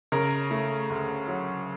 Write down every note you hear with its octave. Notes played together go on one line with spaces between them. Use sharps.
C#3 A#4
A3
D2
F#3